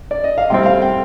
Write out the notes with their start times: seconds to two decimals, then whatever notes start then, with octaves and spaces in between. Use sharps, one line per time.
0.11 D5
0.24 D#5
0.38 F5
0.50 C3 G3 C4 G5
0.66 F5
0.82 G5